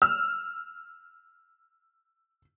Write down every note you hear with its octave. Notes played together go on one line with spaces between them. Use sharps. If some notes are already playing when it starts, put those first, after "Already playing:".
E6 F6